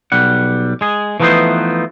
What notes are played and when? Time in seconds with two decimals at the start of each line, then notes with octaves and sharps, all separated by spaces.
0.12 B1 G3 F#5
0.81 G#3 G#4
1.20 E3 F3 A3 B3 D#4 C5